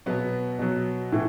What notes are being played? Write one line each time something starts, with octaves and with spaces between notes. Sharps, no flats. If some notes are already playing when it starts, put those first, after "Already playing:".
B2 F#3 B3
B2 F#3
A2 E3